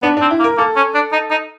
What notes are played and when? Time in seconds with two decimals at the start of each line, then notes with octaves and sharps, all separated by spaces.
0.03 B3 D4
0.17 D4
0.21 C4
0.31 E4
0.40 A#3
0.44 A#4
0.57 A#3 A4
0.76 C#4
0.94 D4
1.12 D#4
1.31 D#4